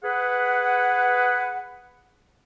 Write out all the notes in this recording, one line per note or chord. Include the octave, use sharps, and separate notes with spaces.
G#4 B4 F#5